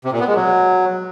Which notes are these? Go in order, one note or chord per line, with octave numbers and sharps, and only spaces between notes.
C3
A#2
B3
G#3
F#3